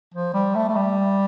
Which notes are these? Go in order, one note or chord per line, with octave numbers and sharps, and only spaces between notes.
F3
G3
A3
A3
G3